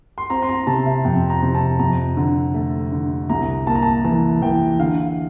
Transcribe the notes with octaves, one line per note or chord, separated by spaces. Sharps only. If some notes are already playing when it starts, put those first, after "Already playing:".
C6
C4 A#5
C6
A#5
C3 A5
E5
F2 G5
A#5
C3
A5
F2 A#5
D3
A3
D3
C2 A#5
A#3 A5
A#5
A5
E3 A5
E3 G5
D3 F5